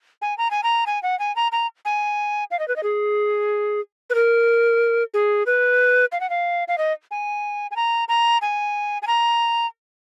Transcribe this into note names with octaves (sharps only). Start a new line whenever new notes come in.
G#5
A#5
G#5
A#5
G#5
F#5
G#5
A#5
A#5
G#5
F5
D#5
B4
D#5
G#4
B4
A#4
G#4
B4
F5
F#5
F5
F5
D#5
G#5
G#5
A#5
A#5
G#5
G#5
A#5